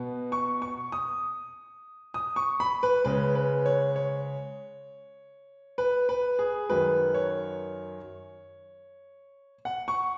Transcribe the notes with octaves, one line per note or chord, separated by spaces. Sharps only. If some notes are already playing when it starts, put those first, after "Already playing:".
Already playing: B2 B3
C#6
C#6
D#6
D#6
C#6
B5
B4
C#3 G#3 C#4 B4
B4
C#5
C#5
B4
B4
G#4
F#2 D#3 F#3 B4
C#5
F#5
C#6